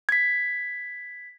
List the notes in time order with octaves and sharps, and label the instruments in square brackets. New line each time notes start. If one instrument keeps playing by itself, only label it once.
[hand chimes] G#6 B6